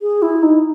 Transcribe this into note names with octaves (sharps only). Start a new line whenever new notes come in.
G#4
E4
D#4